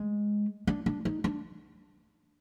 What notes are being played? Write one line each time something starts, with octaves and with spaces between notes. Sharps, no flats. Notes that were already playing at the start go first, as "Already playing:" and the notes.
Already playing: G#3
D4
D4
D#4
D4